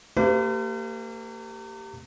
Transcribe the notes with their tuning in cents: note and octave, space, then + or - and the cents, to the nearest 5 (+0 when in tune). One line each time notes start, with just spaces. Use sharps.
A#3 -40 G4 +0 B4 +45